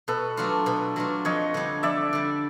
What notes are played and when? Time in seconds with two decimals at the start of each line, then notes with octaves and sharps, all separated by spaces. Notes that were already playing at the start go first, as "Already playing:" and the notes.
0.08 B2 A4 B4
0.37 F#3 A3 D4 F4
0.66 B2
0.96 F#3 A3 D4 F4
1.25 F2 C#5 D#5
1.54 D3 G3
1.83 F2 D5 E5
2.13 D3 G3